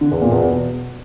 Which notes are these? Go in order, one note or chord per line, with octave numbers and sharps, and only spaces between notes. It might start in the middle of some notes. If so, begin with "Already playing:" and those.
D3
E2
A#2
E2
B2